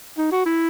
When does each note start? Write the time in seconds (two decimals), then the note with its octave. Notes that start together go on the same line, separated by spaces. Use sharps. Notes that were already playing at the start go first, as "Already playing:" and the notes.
0.18 D#4
0.32 F#4
0.46 E4